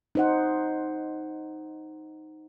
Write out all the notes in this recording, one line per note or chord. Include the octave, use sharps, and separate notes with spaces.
D#4 C5 F#5